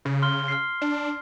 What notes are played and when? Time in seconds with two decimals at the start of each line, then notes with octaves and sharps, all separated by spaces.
0.05 C#3
0.22 C6 F6 G7
0.48 F6 C7
0.82 D4